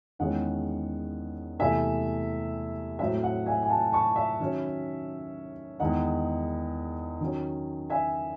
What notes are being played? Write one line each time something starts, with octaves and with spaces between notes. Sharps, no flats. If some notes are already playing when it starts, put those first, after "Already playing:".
E2 D#3 G#3 C#4 F#5
E2 C3 E3 A3 E5 G#5
A2 F#3 C4 E5
F#5
E5 G#5
G#5
F#5 A5
A5 C#6
E5
D#3 F#3 C#4
E2 D#3 G#3 D#4 F#5
D#3 F#3 C#4
E5 G#5